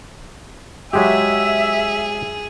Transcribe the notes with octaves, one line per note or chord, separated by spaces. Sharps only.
F#3 G#3 G4 G#4 E5